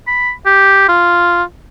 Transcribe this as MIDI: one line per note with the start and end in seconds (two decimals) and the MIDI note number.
0.07 0.32 83
0.46 0.85 67
0.89 1.43 65